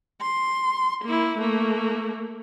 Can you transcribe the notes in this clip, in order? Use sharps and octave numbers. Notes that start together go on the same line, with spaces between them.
C6
A#3 E4
A3 A#3